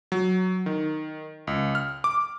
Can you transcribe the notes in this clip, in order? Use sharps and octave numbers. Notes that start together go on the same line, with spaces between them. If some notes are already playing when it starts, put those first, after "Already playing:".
F#3
D#3
C#2
F6
D6